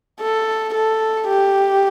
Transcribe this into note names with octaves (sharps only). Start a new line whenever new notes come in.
A4
A4
G4